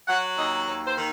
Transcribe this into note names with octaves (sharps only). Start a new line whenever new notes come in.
F#3 F#5
D#2 D#5
D#2 C#5
C5
D#3